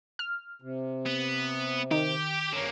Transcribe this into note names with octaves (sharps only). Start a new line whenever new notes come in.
F6
C3
B3
D#3 G4
G2 D3 A#3 C#4